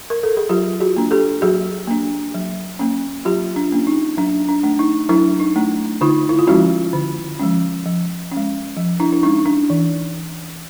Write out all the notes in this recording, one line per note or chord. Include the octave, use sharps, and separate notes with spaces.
A#4
A4
G#4
F#3 F4 G4
F#4 G#4
A#3 D4
G4 A4
F#3 F#4 G#4
A#3 D4
F#3
A#3 C#4
F#3 F4 G4
D4
A#3 C#4
D#4
F#3 D4
D4
A3 D4
D#4
F#3 D4 E4
D#4
A3 D4
D3 D#4 F4
E4
F4
F3 G#3 C#4 E4 F#4
D3
F3 G#3 C#4
F3
G#3 C#4
F3
D4 E4
E4
G#3 C#4 D#4
D4
E3